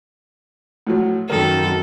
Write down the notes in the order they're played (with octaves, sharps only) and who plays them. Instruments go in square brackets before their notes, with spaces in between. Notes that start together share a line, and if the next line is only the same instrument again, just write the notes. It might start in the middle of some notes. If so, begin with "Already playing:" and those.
[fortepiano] A2 F3 F#3
[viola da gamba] F#2 A4 [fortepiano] D#3 A#4